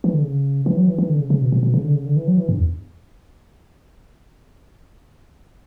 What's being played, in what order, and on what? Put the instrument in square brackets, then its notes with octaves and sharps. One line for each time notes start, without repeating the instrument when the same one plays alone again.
[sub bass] E3
D3
C#3
E3
F#3
E3
E3
D3
C#3
C#3
B2
B2
B2
C#3
D3
C#3
D3
E3
F#3
E3
G2
E2